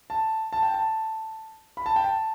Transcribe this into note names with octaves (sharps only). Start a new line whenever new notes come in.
A5
A5
G5
A5
B5
A5
G5
A5